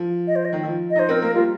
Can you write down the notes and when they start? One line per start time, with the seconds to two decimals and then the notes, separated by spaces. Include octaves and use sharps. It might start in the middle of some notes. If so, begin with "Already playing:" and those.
Already playing: F3
0.27 D#5
0.36 C5
0.45 D#5
0.53 D#3
0.63 F3
0.90 D#5
0.96 D#4 C5
1.09 C4 A#4
1.22 A#3 A#4
1.35 G3 F4